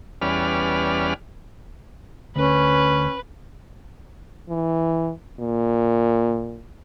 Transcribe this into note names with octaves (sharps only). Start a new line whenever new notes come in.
E2 G3 C#4 B4 D5 F6
D2 C#4 B4
E3
A#2